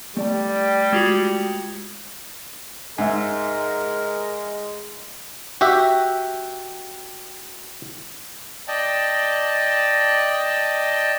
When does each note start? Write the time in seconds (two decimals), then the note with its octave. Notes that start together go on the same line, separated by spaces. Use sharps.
0.17 G3 A3 D5 A5
0.93 G#3 F4 F#4
2.98 G#2 G#3 A#4 E5 G#5
5.61 F#4 G4 E5
8.68 D5 D#5 G5 A5